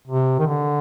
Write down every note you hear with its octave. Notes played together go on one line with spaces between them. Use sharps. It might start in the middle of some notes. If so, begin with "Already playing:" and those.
C3
D#3
D3